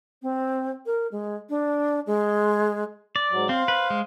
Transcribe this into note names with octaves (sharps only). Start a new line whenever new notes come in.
C4
A#4
G#3
D4
G#3
D5
G#2 F#3
C4 C5 F5
B4
G#3